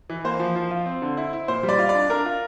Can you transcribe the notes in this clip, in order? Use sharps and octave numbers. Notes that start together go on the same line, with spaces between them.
E3
A#3 C5
F3
F3
F4
C4
D3
E4
E4
A#2 C5
G3
D5
F4
D5
D4
D4 A#4
F4